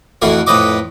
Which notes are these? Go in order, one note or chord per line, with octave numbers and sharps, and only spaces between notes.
F2 A2 E3 F#4 F5
F2 A2 B4 D#5 D6